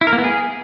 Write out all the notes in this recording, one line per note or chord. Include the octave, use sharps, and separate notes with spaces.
E4
A#4
A#3
B3
G#4